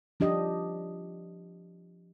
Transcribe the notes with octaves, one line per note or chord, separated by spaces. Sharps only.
F3 D4 G4 D#5